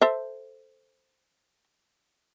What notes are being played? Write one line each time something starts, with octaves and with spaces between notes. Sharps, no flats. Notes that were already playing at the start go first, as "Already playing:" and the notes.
A4 C5 E5